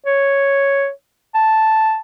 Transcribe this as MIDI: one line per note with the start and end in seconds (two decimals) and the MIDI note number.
0.06 0.90 73
1.34 1.99 81